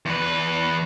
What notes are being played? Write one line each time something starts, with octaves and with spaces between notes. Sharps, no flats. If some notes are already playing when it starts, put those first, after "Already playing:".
E2 B4